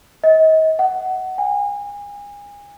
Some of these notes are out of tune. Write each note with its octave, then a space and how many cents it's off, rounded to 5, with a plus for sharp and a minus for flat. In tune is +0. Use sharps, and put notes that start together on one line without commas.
D#5 +35
F#5 +20
G#5 -30